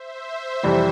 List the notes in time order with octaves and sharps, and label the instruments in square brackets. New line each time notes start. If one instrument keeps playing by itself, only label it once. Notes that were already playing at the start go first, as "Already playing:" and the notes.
Already playing: [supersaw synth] C5 E5
[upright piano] F2 C3 E3 G3